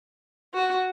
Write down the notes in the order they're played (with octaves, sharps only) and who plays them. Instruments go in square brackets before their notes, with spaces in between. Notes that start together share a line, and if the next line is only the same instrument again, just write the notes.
[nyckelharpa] F#4